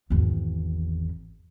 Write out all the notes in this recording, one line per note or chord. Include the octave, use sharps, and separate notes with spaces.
G#1 E2